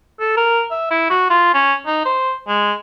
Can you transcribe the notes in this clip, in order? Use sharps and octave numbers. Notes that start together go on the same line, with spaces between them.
A4
A#4
E5
E4
F#4
F4
C#4
D#4
C5
G#3